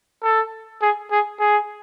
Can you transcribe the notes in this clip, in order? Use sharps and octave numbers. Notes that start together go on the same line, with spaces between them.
A4
G#4
G#4
G#4